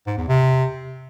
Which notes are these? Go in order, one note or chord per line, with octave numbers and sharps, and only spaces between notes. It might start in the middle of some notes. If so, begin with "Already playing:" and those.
G#2
E2
C3